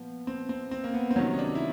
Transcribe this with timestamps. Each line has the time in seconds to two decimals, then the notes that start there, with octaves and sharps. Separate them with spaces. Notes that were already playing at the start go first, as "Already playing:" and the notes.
Already playing: A#2 F3 B3
0.27 C4
0.49 C4
0.71 C4
0.84 A#3
0.94 B3
1.11 C4
1.16 C3 D#3 F#3 C#4
1.34 D#4
1.39 D4
1.55 E4